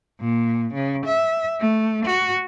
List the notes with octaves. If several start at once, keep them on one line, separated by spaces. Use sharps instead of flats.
A#2
C#3
E5
A3
F#4